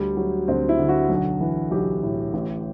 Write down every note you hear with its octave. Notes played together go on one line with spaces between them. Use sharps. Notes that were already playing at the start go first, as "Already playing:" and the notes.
Already playing: D2 G3
F#3
D2 C4
E4
D3
F#4
B1
E3
B1 G4
A2
A1